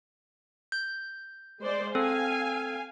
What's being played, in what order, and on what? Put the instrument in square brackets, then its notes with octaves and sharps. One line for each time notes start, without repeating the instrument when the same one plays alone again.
[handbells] G6
[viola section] G#3 C5 D5
[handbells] C4 A4 [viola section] F5 G#5